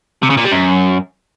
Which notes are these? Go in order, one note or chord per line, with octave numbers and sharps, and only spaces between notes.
C3
C#3
A#2
G3
F#2